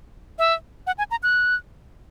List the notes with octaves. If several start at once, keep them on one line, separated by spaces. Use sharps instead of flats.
E5
F#5
G#5
A#5
F#6